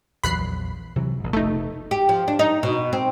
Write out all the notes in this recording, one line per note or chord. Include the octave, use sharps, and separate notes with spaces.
A#1 E2 F#3 B5 F#6 C7
C3 E3 F#3
A#1 G#2
F1 B2 A3 D#4
G4
F3
D4
D#4
B2
C4